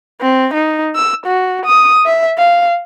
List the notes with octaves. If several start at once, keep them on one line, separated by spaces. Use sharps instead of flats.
C4
D#4
E6
F#4
D#6
E5
F5